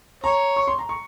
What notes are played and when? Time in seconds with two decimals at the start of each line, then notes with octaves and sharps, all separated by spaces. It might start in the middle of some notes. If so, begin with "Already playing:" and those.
0.24 C#5 A#5
0.56 C#6
0.68 C6
0.79 A#5
0.89 C#6